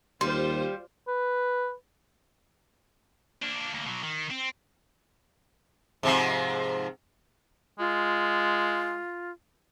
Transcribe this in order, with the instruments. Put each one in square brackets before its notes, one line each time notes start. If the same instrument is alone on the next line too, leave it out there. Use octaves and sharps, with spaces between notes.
[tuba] D#2 [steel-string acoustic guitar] G3 [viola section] F4 C5 [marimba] C6
[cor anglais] B4
[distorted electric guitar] A#3 D4
D2 A#3
B2 F#3
D#3
C4
[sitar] G#2 C3 F3
[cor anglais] G#3 [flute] F4